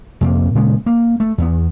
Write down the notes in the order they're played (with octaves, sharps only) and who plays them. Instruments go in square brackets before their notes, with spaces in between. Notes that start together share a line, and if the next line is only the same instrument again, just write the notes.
[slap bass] F2 C3 A#3
A#2 C#3 G#3 B3
A#3
A3
E2 B3